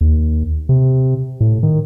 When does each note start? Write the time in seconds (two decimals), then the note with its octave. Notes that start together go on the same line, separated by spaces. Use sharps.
0.01 D#2
0.69 C3
1.40 A2
1.63 D#3